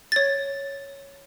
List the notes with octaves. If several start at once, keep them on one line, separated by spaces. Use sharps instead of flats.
C#5 A6